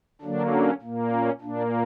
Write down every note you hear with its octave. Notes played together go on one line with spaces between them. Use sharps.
D3 F#3 A#3 D4
C#4
A#2 A#3
C#4
A#2 A#3 D4